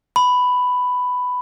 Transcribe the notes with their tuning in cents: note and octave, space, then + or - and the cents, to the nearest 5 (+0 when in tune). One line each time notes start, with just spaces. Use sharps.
B5 +10